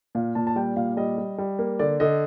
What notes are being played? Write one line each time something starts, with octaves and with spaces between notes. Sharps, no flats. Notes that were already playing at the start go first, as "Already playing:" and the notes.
A#2 F5
A#2 A5
A5
G3 G5
A#2 F5
G3 D#5
G3
G3
A#3
D3 D5
D3 D#5